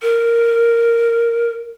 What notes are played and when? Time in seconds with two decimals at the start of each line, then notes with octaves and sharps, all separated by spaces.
0.03 A#4